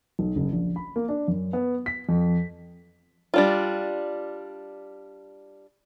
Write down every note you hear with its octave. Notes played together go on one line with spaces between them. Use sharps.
B1
F#1
A#1
B5
A#3
D4
F#2
B3
B6
F2
G3 D4 F4